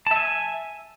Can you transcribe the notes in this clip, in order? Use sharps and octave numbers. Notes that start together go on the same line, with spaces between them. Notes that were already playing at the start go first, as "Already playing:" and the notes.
E5 G#5 A5